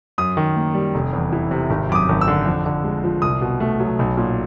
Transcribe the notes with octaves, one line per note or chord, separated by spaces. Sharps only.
F#2 D#6
D#3
A#3
G3
F1
E2
E3
C3
G#1
F#2 D6
D#6
G#1
E6
D3
F2
D3
G#3
F3
C2 D#6
B2
A3
F#3
B1
A#2